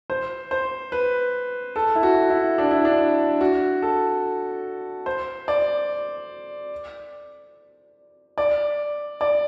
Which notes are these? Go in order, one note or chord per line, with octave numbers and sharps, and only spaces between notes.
C5
C5
B4
A4
E4
F#4
E4
D4
E4
D4
F#4
A4
C5
D5
D5
D5